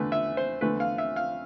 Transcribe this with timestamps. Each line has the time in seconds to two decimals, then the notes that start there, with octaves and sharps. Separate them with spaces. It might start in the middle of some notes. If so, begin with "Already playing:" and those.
Already playing: E2 D3 A3 B4
0.12 E5
0.37 C5
0.61 E2 D3 A3 B4
0.80 F5
0.98 E5
1.16 F5